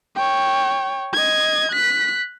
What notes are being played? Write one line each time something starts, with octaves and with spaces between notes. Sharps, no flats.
C#5 G5
D#5 G#6
F#6 B6